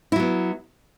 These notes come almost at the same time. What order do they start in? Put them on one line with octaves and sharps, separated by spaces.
E4 F#3 B3